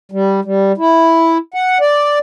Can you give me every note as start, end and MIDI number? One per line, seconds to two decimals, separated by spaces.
0.12 0.40 55
0.45 0.72 55
0.77 1.38 64
1.54 1.78 78
1.80 2.19 74